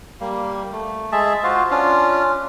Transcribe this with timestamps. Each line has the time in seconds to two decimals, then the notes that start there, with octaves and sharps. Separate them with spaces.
0.20 G3 A#3
0.72 A3
1.12 G#3 G#4 E5 A5
1.43 F4 F#4 C5 F5
1.71 C#4 D4 F4